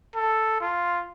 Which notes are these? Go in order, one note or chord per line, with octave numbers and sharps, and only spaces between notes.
A4
F4